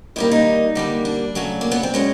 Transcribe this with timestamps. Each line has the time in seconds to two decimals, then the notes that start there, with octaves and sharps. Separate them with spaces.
0.16 D#3 G3 A#3 E4
0.31 D#4
0.75 D3 G3 A#3
1.05 D4
1.35 C#3 F#3 A3
1.61 A#3
1.72 B3
1.83 C4
1.94 B2 G#3 C#4